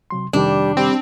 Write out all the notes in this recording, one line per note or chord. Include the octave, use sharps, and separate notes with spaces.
C3 F#3 C6
F2 C3 D#3 G3 D4
G3 C4